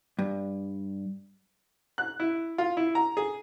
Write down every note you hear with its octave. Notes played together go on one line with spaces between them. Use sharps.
G2
F#6
E4
F4
E4
A#5
G#4